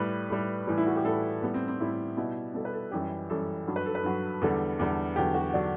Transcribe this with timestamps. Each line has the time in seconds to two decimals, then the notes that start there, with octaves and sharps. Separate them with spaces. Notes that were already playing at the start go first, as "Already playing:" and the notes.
Already playing: A2 G3 B4
0.30 A2 G3
0.67 A2 E3 G3
0.78 E4
0.87 F#4
0.96 G4
1.04 A2 E3 G3 A4
1.42 A2 G3 B3
1.54 C4
1.68 C4
1.80 A2 G3 E4
2.17 B2 G3 E4
2.54 B2 G3 A4
2.65 B4
2.73 A4
2.91 F#2 E3 G3 G4
3.30 F#2 E3 G3 A4
3.67 G2 F#3
3.76 B4
3.86 A4
3.95 B4
4.04 G2 F#3
4.41 E2 D3 G3 A4
4.79 E2 D3 G3
5.16 E2 D3 F#3 G4
5.35 F#4
5.54 D3 F#3 D4